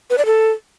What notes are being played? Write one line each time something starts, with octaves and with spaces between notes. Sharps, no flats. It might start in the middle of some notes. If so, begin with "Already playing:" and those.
B4
D5
A4